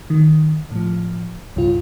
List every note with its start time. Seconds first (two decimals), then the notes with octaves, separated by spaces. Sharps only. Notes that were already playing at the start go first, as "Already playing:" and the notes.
0.10 D#3
0.71 A2 F3
1.56 C#2 G2 B2 F4